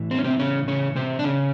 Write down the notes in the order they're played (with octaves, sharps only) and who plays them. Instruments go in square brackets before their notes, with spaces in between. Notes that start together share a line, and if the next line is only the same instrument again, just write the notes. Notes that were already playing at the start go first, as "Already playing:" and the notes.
Already playing: [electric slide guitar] A2 E3
C4
C#4
C3 C4
C#3 C#4
C#3 C#4
C3 C4
D4
C#3 C#4